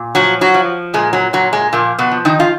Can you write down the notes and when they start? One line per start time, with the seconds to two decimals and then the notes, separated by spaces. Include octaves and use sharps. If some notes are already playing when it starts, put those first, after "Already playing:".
Already playing: A#2
0.15 F3 F#3 F#4
0.41 F#3 F#4
0.54 F3
0.94 A#2 G#3
1.13 F#3
1.33 A#2 F#3
1.53 G#3
1.73 A#2 F3 A#3
1.99 B2 B3
2.11 F3
2.25 D#3 D#4
2.40 F4